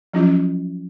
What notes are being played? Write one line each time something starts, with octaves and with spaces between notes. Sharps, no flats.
F3 F#3 C#4 E4 F4